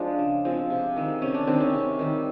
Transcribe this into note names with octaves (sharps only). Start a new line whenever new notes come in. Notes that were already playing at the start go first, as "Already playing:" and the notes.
Already playing: F3 G#3 D4
C#3
F3 G#3 C4
C3
D#3 G#3
C3 C#4
D4
D#3 G#3 C4
C#4
C3
D#3 G3